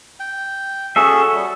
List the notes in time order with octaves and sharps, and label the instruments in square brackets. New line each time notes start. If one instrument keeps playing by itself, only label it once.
[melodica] G5
[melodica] C#4 G#4 [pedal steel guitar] F#4 A4 E5
[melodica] G3